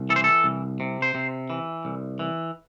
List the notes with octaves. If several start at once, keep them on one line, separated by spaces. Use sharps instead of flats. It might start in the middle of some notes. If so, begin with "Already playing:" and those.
Already playing: C2
E3 A4
C5
A4
C2
C3
C5
C3
E3
C2
E3